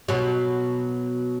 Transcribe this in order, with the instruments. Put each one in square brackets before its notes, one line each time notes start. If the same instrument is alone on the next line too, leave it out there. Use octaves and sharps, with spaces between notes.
[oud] B2 F#3